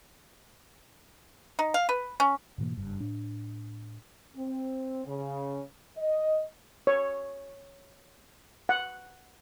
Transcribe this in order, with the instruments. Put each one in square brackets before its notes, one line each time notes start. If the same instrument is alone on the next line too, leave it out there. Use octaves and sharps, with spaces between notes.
[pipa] D#4
F5
B4
C#4
[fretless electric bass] G#2 B2 E3 A#3
F#1 G2
A2 D4
[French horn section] C4
C#3
D#5
[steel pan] C#5
F#5